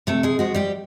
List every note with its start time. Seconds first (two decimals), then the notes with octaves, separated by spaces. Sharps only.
0.07 C3 A3 A4
0.23 G#3 G#4
0.39 F3 G#3 F#4
0.55 G3 G4